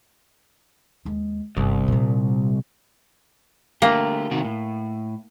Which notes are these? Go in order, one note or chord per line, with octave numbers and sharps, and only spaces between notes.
D#2 G#3
G1 C2
A#2 G3
D3 A3 A#3 G4
C3 D#3 F#4
A2